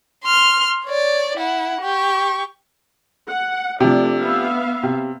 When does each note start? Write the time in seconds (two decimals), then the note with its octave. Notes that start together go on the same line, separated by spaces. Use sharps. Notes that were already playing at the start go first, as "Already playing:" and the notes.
0.24 C6 F6
0.85 C#5 D5
1.37 E4 F#5
1.81 G4 C#6
3.28 F#5
3.80 C3 F3 A3 D4 D5
4.18 B3 E5 F5
4.83 C3